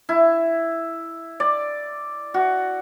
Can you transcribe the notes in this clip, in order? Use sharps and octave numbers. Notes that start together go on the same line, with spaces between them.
E4
D5
F#4